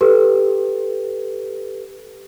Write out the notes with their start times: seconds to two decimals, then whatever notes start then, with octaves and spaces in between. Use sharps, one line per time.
0.01 G4 A4 B4